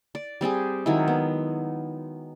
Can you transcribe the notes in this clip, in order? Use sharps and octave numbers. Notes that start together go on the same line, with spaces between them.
D5
G3 C4 G4 G#4
D#3 F#3 G#3 E4
B3